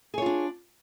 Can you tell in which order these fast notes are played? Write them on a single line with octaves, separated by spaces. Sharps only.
G#4 C#5 F4 D4